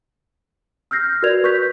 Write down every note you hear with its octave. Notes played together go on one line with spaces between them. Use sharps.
E6 F6 G6 A#6 C7
F#4 A#4 B4 D5 G#6 F7
B4 C#6 F#6 G6 B6